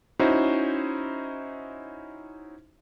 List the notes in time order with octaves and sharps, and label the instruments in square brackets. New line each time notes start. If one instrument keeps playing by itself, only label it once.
[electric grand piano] C#4 D#4 E4 F#4 C5